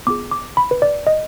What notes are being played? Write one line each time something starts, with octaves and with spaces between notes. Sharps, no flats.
B3 F4 G#4 D6
D6
B5
B4
D5
D#5